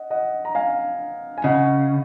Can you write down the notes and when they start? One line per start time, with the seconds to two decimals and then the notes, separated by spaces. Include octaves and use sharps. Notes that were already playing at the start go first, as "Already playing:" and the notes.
Already playing: D#5 F#5
0.10 D#5 F#5
0.45 A#5
0.55 F5 G#5
1.38 G#5
1.44 C#3 D#5 F#5